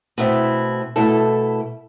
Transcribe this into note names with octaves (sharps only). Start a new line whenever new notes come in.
B2 A3 C4 E4
B2 A3 E4 A4